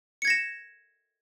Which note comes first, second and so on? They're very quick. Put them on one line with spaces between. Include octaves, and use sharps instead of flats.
C#7 G#6 A#6 E7